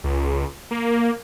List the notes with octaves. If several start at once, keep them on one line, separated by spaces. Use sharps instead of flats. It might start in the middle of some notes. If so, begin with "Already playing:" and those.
C#2
A#3